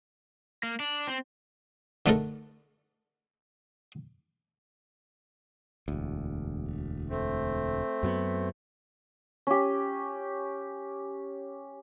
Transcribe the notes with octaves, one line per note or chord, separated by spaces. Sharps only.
A#3
D4
C4
D3 A3 D#4 A4 A#4
E1 D2
A3 C4
F#2 F#3 B3
C#4 G4